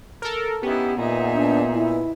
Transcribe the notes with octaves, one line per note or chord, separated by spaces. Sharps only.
A4 A#4
B3 C#4 D#4 E4 G4
A#2 D#4 G#4 E5
D4
E4